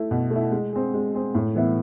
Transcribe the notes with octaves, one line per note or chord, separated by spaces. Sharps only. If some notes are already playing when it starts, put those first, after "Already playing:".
Already playing: A3 E4
B2
A3
E4
G#3
C4 G#4
G#3
C4 G#4
A2
E3 B3 E4